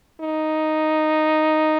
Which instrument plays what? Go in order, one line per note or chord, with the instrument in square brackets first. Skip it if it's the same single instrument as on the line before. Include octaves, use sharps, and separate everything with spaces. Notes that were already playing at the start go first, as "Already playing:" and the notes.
[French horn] D#4